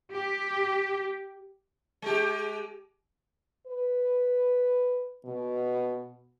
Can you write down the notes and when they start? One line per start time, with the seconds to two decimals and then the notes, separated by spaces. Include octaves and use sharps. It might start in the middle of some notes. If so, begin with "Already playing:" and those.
0.11 G4
2.02 G#3 G4
3.67 B4
5.25 B2